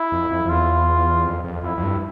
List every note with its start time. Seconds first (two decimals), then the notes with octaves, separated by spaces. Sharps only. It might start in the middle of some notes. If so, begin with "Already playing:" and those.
Already playing: E4
0.12 F2
0.31 F2
0.45 F2
0.50 E2 F4
1.26 F2
1.44 F2
1.63 F2 E4
1.77 F2
1.83 G2